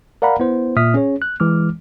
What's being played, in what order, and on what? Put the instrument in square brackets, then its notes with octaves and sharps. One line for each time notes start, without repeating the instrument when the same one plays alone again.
[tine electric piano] A#4 D5 F5 F#5 A#5 B5
B3 E4 C5
A#2 E5 D#6 F6 B6
C#4 G#4 C#5
F#6
E3 G#3 D6 F6